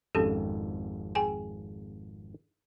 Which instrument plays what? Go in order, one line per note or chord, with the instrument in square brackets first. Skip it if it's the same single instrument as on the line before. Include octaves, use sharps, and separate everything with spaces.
[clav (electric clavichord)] G#1 F2 G#2 [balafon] C#4 G4 A4
[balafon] G#4 G5 G#5